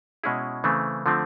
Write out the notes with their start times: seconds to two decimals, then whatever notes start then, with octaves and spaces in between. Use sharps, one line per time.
0.24 B2 G#3 C#4 E4 G#4
0.64 C#3 E3 A3 C4
1.06 D3 F3 A3 C4